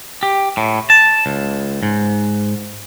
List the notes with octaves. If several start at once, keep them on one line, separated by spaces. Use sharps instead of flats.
G4
A2
A5
C#2
G#2